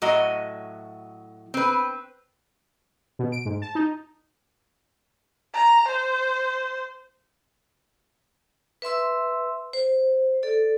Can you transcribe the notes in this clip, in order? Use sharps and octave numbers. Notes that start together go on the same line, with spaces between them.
A2 F#3 F#4 D#5
C4 B4
B2
D7
G#2
A5
D#4
A#5
C5
B4 E5 C6 E6
C5
A4 D5